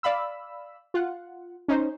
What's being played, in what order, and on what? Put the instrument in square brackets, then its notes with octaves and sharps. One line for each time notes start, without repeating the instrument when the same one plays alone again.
[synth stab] D5 F5 B5 E6
F4 F#5
C#4 D#4 C5